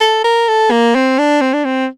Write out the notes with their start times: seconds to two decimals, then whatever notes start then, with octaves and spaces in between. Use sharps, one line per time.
0.01 A4
0.24 A#4
0.48 A4
0.71 A#3
0.95 C4
1.18 D4
1.41 C4
1.53 D4
1.65 C4